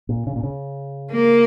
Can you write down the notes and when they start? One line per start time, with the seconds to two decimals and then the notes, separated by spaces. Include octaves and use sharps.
0.09 A#2
0.27 C#3
0.36 A#2
0.43 C#3
1.12 A#3